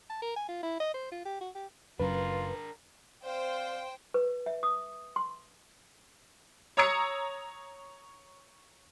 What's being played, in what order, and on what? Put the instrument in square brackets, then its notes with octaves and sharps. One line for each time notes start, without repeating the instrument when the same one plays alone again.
[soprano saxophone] A5
A#4
G#5
F4
E4
D#5
C5
F4
G4
F#4
G4
[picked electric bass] F#1 F#2 [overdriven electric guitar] D4 A#4 [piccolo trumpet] F4 [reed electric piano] B4
[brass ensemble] C4 D5 F5 [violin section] C5 G5
[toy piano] B4
E5
D#6
C6
[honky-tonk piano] C#5 A#5 D#6 E6 G#6 C#7